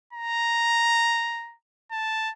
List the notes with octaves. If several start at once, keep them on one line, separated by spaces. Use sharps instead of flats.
A#5
A5